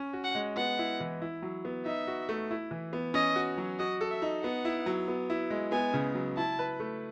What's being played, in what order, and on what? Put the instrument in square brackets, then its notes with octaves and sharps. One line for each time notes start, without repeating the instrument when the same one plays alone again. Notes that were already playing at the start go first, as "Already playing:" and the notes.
Already playing: [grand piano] C#4
F#4
[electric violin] F#5
[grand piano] G#3
[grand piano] B3 [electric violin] F#5
[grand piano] E4
E3
E4
F#3
B3
[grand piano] D#4 [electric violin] E5
[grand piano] F#4
A3
E4
E3
B3
[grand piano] C#4 [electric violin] D#5
[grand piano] F#4
F#3
[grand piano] F#4 [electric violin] D#5
[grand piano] A4
[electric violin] E5
[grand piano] D#4
[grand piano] B3 [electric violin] F#5
[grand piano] E4
F#3
B3
E4
G#3
[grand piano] B3 [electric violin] G#5
[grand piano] C#3
F#3
[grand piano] E4 [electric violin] A5
[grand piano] B4
A3